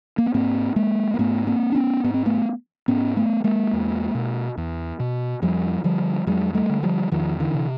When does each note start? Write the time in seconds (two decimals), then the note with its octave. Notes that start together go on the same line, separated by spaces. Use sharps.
0.18 A#3
0.26 B3
0.34 G#2 A#3 C4
0.76 G#3 A#3
1.14 A#3
1.19 G#2 A3 B3
1.47 A#3 C4
1.72 D4
1.75 B3 C#4
2.04 G#2 B3
2.14 C4
2.26 A3 B3
2.88 G#2 B3 C#4
3.17 A3 B3
3.44 G#3 A#3
3.73 E2
4.15 B2
4.57 E2
5.00 B2
5.42 F2 F3 G3
5.84 D3 F3 G3
6.27 F2 F#3 G#3
6.54 G3 A3
6.69 D3
6.83 F3 G3
7.12 E2 D#3 F3
7.40 D3 E3
7.54 C3